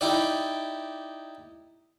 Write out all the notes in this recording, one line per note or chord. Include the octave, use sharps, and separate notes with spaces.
D#4 E4 G4 D5